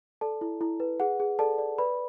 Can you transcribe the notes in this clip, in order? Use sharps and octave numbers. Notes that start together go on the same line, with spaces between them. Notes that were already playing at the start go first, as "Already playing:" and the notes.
A4 D5 A5
E4
E4
B4
G#4 F#5
G#4
A4 D5 A5
D5
B4 D5 B5